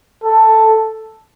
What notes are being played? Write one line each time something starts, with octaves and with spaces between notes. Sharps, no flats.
A4